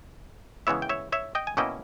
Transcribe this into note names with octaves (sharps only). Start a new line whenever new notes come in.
C#3 E3 G#3 B3 E4 C#5 E5
G5
C#5 E5
C#5 E5
D#5 G5
G#5
B2 A#3 C#4 E4 D#5 G5